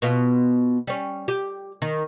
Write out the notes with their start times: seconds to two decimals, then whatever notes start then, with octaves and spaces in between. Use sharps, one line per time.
0.02 B2 B3 F4
0.87 G3 C#4
1.28 G4
1.82 D#3